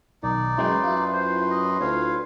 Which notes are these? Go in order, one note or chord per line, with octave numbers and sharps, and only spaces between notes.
B1 D#3 D#4 D5
F#2 E3 G#3 B4 G5 C6
F#2 E4 F4
C5
D#5
D2 C#5 F5